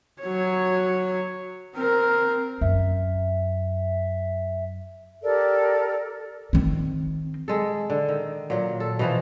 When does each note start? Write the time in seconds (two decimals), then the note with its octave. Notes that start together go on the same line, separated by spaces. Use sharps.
0.22 F#3 C#5
1.76 C4 A#4
2.61 F#2 E5
5.23 G4 A4 A#4 D5
6.53 D#3 C4
7.48 G#3 A4
7.90 D3
8.08 D#3
8.50 A#2 F#3
8.80 A4
8.99 B2 E3 F3